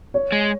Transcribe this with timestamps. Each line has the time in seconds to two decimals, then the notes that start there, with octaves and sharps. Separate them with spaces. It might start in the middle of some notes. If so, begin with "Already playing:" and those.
0.14 C#5
0.32 G#3